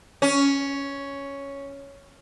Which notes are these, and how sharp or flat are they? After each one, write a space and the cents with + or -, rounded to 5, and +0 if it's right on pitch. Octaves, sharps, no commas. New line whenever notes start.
C#4 +5